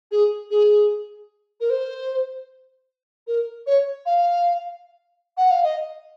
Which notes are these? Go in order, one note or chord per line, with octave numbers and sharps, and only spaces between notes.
G#4
G#4
A#4
C5
A#4
C#5
F5
F#5
F5
D#5